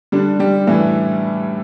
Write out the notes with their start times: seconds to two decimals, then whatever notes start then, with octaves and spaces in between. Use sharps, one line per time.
0.12 D3 G3 D4
0.40 G3 G4
0.67 A2 E3 E4